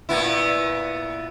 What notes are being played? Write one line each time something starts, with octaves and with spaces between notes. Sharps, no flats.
A#2 B3 E4